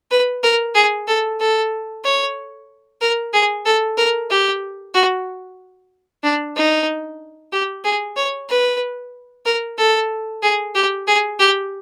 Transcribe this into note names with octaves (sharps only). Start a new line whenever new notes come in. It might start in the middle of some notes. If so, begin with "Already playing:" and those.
B4
A#4
G#4
A4
A4
C#5
A#4
G#4
A4
A#4
G4
F#4
D4
D#4
G4
G#4
C#5
B4
A#4
A4
G#4
G4
G#4
G4